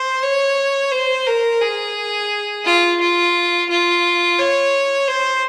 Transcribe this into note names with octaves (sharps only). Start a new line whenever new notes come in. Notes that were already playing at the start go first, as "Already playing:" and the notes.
Already playing: C5
C#5
C5
A#4
G#4
F4
F4
F4
C#5
C5